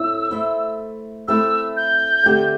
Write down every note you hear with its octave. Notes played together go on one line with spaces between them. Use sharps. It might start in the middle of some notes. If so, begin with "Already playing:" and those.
Already playing: A2 A3 C4 E6
A3 E4 C5 E5
A3 C4 E4 C5 E6
G6
D3 A3 C4 G4